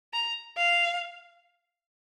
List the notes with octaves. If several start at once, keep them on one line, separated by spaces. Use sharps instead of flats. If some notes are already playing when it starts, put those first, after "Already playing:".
A#5
F5